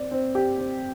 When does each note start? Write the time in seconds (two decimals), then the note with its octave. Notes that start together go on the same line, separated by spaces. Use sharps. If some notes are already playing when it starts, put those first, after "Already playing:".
Already playing: C4 D5
0.11 C4
0.35 G4
0.58 C4